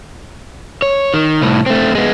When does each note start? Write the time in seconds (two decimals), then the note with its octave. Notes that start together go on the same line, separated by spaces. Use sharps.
0.82 C#5
1.14 D#3
1.41 C2 A2
1.66 A3 C4
1.95 G#3 B3